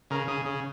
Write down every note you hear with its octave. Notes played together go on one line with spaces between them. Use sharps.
C#3 A#4
C#3 G#4
C#3